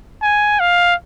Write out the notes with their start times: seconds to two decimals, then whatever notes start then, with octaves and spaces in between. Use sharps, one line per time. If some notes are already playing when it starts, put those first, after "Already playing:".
0.23 G#5
0.60 F5